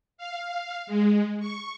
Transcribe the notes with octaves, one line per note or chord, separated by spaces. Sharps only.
F5
G#3
C#6